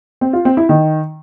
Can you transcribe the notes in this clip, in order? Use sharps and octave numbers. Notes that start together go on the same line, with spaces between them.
C4
F4
C4
E4
D#3